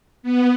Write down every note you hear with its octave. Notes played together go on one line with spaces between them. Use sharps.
B3